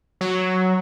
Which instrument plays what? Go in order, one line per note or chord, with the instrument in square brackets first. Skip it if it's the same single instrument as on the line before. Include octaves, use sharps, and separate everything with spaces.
[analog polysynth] F#3